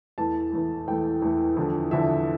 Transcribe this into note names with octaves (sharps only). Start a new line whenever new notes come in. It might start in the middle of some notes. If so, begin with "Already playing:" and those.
E2 E3 A3 A5
E2 E3 A3
E2 E3 A3 G5
E2 E3 A3
E2 D3 F3
E2 D3 F3 E5